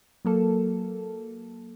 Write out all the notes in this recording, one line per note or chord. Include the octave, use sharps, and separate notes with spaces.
F#3 A#3 A4